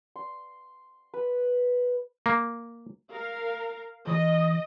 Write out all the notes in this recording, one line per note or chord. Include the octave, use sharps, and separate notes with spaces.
C6
B4
A#3
A#4 F5
E3 D#5